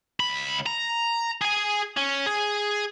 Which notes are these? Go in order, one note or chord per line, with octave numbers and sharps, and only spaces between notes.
C#2 B5
A#5
G#4 G#5
C#4
G#4